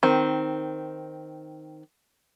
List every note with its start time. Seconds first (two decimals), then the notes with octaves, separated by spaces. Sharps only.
0.03 D#3 C4